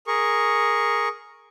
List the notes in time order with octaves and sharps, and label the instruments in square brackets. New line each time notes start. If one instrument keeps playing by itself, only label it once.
[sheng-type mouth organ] G#4 A#4 C#6